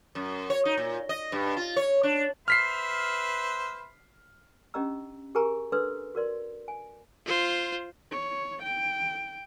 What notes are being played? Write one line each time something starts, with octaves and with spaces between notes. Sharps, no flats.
F#2
C#5
D#4
A#2
D#5
G2
F4
C#5
D4
B4 C5 E5 F6 B6 C7
C#4 D4 G4 D#5 A#5 E6
G4 G#4 A#4 G#5 A#5 C#6
D4 A4 B4 C6 E6
F#4 A#4 D5 C6
G#5
F4 C5
C#5
G5